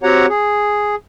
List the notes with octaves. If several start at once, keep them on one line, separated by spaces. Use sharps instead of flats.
C4 F#4 G4 C#5 F#5 A#5
G#4